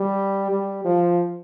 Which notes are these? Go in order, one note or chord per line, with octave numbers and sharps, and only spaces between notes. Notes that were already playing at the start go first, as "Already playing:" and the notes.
Already playing: G3
G3
F3